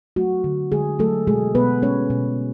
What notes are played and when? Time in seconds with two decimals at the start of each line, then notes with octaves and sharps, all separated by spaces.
0.16 F#3 A3 F#4
0.44 D3
0.72 D3 G#3 G#4
0.99 F#3 A3 A4
1.27 B2 G#3 G#4
1.55 B2 B3 B4
1.82 G#3 C#4 C#5
2.10 B2